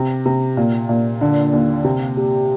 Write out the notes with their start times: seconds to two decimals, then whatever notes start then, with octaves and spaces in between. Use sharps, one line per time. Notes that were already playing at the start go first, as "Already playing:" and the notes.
Already playing: C3
0.26 C3
0.57 A#2
0.89 A#2
1.21 D3
1.53 D#2
1.84 C3
2.17 G4